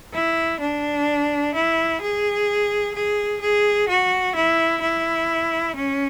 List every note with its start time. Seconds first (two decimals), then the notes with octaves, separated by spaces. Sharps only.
0.14 E4
0.60 D4
1.55 E4
2.01 G#4
2.95 G#4
3.41 G#4
3.89 F#4
4.35 E4
4.82 E4
5.75 C#4